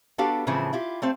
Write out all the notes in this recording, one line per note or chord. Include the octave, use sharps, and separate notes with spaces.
B3 D4 F#4 G4 A4 F5
A2 C#3 E3 F3 C4 E4
E4 F4 G4
A3 C4 C5 F5